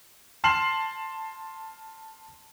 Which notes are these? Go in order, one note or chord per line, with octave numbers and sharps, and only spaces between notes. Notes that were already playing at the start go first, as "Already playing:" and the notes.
A5 C6 F6 C7 E7 F#7